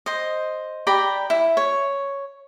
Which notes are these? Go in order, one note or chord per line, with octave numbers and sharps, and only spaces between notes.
C5 D#5
G4 D5 A#5 B5
E4
C#5